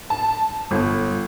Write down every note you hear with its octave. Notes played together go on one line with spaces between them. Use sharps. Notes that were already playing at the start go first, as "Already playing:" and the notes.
A5
G1